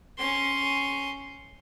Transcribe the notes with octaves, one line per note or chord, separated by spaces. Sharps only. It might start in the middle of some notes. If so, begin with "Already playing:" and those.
C#4 C6